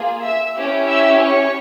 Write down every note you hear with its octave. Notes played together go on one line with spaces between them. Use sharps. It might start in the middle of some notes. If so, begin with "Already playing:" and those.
Already playing: A#3 F4 G#4
E5 E6
C#4 E4 G4
E5 E6
C#5 C#6